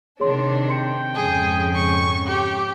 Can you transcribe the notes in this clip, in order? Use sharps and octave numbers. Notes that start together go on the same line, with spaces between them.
C3 D#3 D4 G#4 C#5 C6
G5 C6 C#7
F2 G#2 C#3 G#4
C#6
G4